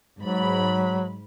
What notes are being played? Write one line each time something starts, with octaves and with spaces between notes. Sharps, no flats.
G#2 F#3 B5